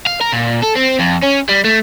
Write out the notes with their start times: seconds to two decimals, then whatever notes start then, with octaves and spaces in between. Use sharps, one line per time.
0.07 F5
0.21 A#4
0.33 A#2
0.63 A4
0.77 C4
1.00 F2
1.23 C#4
1.49 G3
1.64 A3